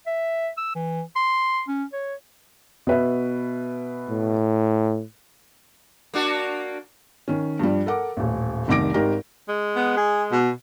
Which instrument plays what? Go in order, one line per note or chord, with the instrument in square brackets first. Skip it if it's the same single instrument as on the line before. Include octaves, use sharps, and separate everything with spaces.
[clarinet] E5
E6
E3
C6
C#4
C#5
[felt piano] B2 B4 E5
[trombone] A2
[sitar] A#3 D4 F#4
[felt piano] D#3 C#4
G2 F3 G3
A4 A#4 F#5 D6
D#1 A1
F1 C2 D#3 D6 A#6 D7
G#1 D#4 G4 A#4
[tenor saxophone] G#3
[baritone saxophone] B3
G#4
B2